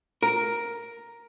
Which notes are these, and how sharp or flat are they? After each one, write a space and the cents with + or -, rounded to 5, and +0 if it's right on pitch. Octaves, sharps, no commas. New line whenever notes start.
A#4 +5